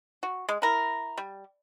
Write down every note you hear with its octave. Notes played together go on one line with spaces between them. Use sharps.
F#4
G#3
E4 A#4
G3